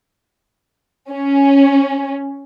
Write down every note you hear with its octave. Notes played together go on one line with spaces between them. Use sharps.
C#4